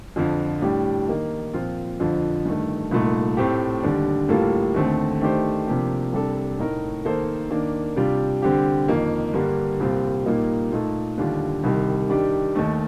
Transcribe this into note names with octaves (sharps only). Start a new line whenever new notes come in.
F2 D3 F3
A2 G3 D4 G4
D#3 A#3 D#4
A#2 F3 C4 F4
F2 D3 F3
G2 D#3 A3
C2 A#2 A3 D#4
A2 A3 C4 G4
D#2 D3 G3 D4
A2 G3 A#3 F4 A4
D#2 D3 A3 C4
D#3 A3 D4 G4 C5
C3 F3 A#3 D4 G4
C2 C3 G3 D4 A4
A2 A3 D#4 A#4
D#3 A#3 D#4 A4 C5
D#3 A#3 D4
C3 G3 D4 F4
D3 G3 C4 G4
F2 D#3 A#3
G2 D3 G3 A#3
C2 A#2 G3 C4 F4
A#2 G3 A#3 D#4
A#2 A3 D#4 A4
D#2 D3 G3 D4 F4
C2 C3 D#3 G3
D#3 G3 D4 G4
D#2 D#3 A3